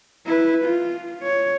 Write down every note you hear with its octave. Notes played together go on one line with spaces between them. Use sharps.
E4 B4
F4
C#5